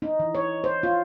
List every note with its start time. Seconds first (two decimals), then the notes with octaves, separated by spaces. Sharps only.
0.02 D#4
0.19 E3
0.35 C#5
0.64 C5
0.83 F4